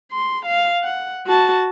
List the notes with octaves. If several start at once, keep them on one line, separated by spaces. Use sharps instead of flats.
C6
F5
F#5
F#4 A5